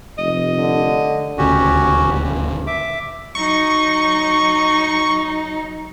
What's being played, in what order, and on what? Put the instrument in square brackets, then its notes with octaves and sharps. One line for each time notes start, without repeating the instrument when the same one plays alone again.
[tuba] F1 [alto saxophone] D#5
[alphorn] D3
[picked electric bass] D#1 D2 C#3 [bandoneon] C#4 F#4 G4
[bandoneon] G2
E5 D6
[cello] F#3 D#4 [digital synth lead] C#6